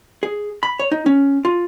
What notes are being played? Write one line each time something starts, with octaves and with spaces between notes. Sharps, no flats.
G#4
B5
C#5
D#4
C#4
F4